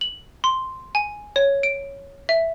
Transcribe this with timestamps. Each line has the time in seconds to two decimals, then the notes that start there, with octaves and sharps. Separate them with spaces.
0.01 F#7
0.44 C6
0.95 G#5
1.36 C#5
1.63 D7
2.29 E5